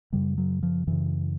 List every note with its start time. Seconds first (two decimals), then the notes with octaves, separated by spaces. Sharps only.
0.12 F#2 C#3 G3
0.38 F#3
0.63 F3
0.87 F#2 C#3 E3